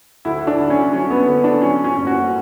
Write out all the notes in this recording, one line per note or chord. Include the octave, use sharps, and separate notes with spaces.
D2 E4
D4
D2
C#4
F#3 C#4
B3
D3
D4
F#3 C#4
C#4
F#1
F#4